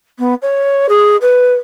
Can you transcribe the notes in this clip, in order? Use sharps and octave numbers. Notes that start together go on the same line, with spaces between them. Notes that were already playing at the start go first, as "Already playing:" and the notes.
B3
C#5
G#4
B4